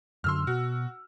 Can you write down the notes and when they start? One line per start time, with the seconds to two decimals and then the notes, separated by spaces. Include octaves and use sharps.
0.24 F#2 D3 C6 E6 F6
0.47 B2 F#4